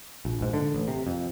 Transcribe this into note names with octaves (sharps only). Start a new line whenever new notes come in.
A#1
A#1 G#2
D3
A1
C3
F2